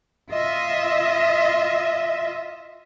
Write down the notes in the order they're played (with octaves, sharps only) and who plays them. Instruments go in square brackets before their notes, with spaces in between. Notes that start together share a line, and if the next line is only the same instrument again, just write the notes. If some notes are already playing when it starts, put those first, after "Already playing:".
[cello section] F4 D#5 E5